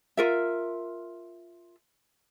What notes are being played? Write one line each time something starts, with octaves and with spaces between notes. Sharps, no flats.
F4 A#4 E5